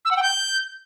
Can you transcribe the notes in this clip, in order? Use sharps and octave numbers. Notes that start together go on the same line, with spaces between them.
E6
F#5
G5
G6